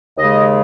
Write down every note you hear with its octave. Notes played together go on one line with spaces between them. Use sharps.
D#2 C#3 G#3 D#5